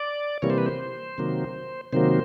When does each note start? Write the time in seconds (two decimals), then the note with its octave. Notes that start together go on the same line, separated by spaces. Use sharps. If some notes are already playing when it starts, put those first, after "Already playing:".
Already playing: D5
0.42 C3 E3 G3 A#3 C#5
0.50 C5
0.58 B4
0.66 C5
1.18 C3 D#3 F#3 A#3
1.93 C3 D#3 F#3 A#3 C5